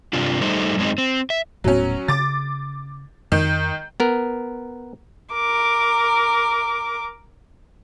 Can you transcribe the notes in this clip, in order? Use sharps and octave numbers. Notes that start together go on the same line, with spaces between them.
G2 C3 C4 D4 F4
G3 A3 D#4 C5
F#2 G#3 A#3 C4 D#4
C4
E5
D#1 A2 F#3 B3 C#4
C#3 D6 A6
F2 D#3
B3 A#4
A#4 D6